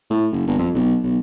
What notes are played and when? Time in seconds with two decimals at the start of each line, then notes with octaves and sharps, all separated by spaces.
0.10 A2
0.32 F#1
0.47 G1
0.58 F2
0.74 B1
1.03 B1